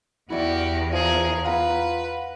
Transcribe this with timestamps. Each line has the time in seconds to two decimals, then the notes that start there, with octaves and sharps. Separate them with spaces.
0.30 E2 E4 F#4 G4 D5
0.93 F3 G#4 A#4
1.44 F4 B4 F#5 A#5